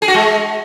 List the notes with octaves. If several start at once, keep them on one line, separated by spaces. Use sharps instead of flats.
G#4
F#4
G#3